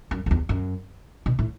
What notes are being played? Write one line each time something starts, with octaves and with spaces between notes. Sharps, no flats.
F#2
F#2
E2
F#2
B2
A2